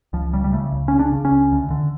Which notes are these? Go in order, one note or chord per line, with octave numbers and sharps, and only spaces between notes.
C#2 F3
C#3 G3
G3
C#3 A3
C#2
C#3 C#4
D4
C#3
C#4
C#2
D2
D3